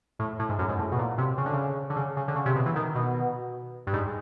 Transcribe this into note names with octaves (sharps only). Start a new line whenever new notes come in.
A2
A2
G#2
F#2
G#2
A2
B2
A#2
C3
C#3
D3
C#3
D3
C#3
C#3
D3
C#3
C3
B2
E3
D#3
B2
G2
G#2